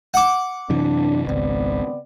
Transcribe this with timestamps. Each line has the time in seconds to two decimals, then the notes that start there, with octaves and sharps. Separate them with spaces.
0.14 F#5 D6
0.70 F#2 C3 E3 D4
1.26 G#1 C#2 B3 C4 D5